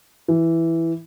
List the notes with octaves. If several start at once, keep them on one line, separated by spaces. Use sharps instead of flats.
E3